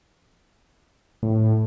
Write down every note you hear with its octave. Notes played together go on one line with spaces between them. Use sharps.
A2